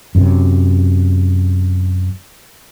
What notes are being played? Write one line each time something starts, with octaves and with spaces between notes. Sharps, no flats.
F#2 C3